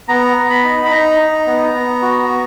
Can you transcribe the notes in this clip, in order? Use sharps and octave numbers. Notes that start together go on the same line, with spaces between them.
B3 A#5
B3
B5
D#4
B5
D#4 A#5
D#4
B3
B3
F#4
B3